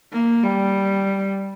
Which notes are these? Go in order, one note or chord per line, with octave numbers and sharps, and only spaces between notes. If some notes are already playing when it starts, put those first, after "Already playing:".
A#3
G3